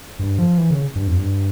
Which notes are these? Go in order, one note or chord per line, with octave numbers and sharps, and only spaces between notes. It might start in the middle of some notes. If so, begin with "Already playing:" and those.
G2
F3
E3
C#3
G2
F2
G2